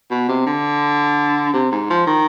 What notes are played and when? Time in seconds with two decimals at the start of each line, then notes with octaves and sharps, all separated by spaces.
0.10 B2
0.29 C3
0.46 D3
1.53 C3
1.72 G#2
1.90 F3
2.07 D#3